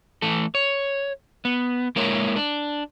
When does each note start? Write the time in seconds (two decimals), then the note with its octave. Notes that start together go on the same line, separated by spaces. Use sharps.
0.22 E3 A3 A4
0.55 C#5
1.45 B3
1.96 G#3 A#3 E4 A#4 C#5
2.36 D4